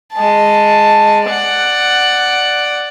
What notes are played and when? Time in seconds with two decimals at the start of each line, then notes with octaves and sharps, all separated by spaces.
0.14 G#3 A5
1.25 D5 F#5